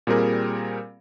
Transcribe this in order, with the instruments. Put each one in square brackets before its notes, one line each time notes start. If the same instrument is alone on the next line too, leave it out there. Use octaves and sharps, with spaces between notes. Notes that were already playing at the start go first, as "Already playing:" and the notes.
[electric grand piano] A#2 G3 C4 G#4 A#4